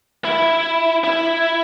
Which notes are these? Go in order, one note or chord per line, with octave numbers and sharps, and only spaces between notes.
E4
E4